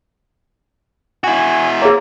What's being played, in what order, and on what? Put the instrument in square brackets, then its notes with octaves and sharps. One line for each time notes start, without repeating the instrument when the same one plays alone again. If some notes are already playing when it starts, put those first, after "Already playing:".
[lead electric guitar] E4 F#4 [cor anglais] G#5
[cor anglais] A#3 [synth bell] G#4 C#5